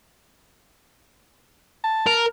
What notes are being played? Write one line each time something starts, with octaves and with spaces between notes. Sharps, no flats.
A5
A#4